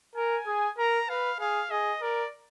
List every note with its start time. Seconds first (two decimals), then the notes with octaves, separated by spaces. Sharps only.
0.16 A#4 G#5
0.46 G#4
0.78 A#4 A#5
1.09 B4 F5
1.40 G#4 F5
1.71 G#4 D#5
2.01 A#4 D5